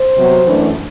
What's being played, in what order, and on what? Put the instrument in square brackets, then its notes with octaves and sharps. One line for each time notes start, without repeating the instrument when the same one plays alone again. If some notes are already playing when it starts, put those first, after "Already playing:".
Already playing: [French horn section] C5
C3 F#3 B3
F#2 E3 A3 D4